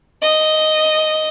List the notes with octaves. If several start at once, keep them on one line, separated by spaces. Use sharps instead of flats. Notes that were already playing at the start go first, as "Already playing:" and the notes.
D#5